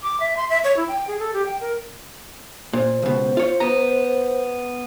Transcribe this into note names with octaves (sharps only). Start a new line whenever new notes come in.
D6
E5
C6
E5
C#5
E4
G5
G#4
A4
G4
G5
A#4
A#2 C5
C#2 B2
F4 C#5
B3 A#5